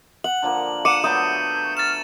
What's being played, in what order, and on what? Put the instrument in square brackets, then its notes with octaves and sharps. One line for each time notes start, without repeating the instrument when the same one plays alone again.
[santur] F#5 [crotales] F#7
[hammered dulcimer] D3 F3 A#3
[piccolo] F#5 [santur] D6 [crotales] C#7 D#7 E7
[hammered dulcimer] F#3 A3 B3 [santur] D#6 [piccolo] G6
[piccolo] F6 [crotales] A6 E7